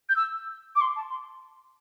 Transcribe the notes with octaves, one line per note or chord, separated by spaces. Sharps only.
G6
E6
D6
C6
A5
C6